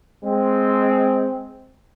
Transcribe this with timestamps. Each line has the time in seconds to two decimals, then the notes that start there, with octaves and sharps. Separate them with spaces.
0.23 G#3 C4